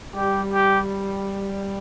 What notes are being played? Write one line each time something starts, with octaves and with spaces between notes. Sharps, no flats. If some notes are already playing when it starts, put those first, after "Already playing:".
G3 G4
G4